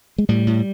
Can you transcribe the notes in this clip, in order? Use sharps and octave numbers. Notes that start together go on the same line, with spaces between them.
G#3
A2 G3
A2